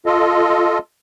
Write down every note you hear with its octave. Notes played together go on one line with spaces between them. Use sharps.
F4 A4 D#5